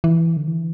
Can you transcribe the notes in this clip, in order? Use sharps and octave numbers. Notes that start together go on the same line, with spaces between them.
E3
D3
E3